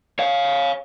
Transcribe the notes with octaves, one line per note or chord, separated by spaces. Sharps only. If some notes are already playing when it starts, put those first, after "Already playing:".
C#5 F5